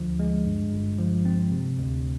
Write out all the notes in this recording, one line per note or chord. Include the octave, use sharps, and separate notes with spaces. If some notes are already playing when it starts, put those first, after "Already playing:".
Already playing: D2 D3 F3
G#3
G2
G1
F3
C4
C3
D2